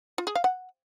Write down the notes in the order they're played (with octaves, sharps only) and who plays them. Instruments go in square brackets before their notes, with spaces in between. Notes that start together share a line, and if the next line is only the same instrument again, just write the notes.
[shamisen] F4
G#4
F5
F#5